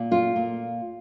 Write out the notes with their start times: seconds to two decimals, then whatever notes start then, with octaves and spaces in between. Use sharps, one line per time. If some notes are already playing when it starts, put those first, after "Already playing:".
Already playing: A#2
0.11 A3 F4
0.36 A#2